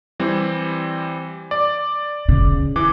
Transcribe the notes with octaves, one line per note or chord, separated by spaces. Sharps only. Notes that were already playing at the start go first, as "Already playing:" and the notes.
E3 G3 C4
D5
C#3
E3 D6